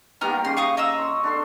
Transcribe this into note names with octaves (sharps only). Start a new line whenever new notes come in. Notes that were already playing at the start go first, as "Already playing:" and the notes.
D#3 G3 A#3 B3 A#5 F6
C#3 C6
F5 C#6 D#6
D#5 A#5 E6
C6 C#6
D4 A4 C6